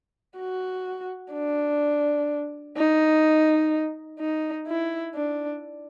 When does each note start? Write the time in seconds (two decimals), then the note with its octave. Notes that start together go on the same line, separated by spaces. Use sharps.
0.38 F#4
1.33 D4
2.77 D#4
4.20 D#4
4.67 E4
5.15 D4